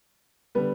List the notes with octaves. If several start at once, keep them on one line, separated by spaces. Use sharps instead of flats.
D3 G3 B3 B4